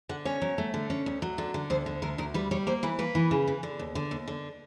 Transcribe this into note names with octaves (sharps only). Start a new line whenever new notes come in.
D3 F#5
C#4 C#5
F#3
A3
D3
C#4
D2
F#3
D3
D3
D2 C5
D3
D2 A#4
D2 A#4
G3 B4
G3 C#5
A#3 C5
E3 B4
A#3 B4
E3
C#3
E3
D3
D#2
D3
D#2
D3